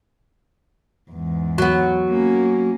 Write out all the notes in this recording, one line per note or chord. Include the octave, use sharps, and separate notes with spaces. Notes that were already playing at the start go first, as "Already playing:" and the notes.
E2 G#2
F#3 B3
A#3 C#4